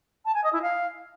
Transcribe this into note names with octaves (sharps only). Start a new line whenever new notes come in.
A5
G#5
D#5
E4
F5